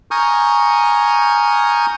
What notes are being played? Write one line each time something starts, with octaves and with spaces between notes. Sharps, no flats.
G#5 A#5 C#6 D#6 F6 G6